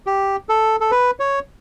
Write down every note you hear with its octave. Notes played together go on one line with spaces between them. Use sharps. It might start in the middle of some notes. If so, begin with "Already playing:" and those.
G4
A4
A4
B4
C#5